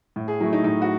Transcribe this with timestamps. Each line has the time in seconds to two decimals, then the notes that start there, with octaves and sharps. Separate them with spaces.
0.16 A2
0.28 G#4
0.40 F#3 A3 E4
0.53 D#4
0.64 A2 D#4
0.82 F#4